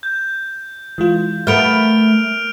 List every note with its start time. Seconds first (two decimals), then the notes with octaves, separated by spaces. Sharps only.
0.03 G6
0.98 E3 G#3 F4
1.47 A3 B3 A#4 F6 D7 F7